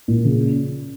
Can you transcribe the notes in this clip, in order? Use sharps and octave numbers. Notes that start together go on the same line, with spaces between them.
A#2
C#3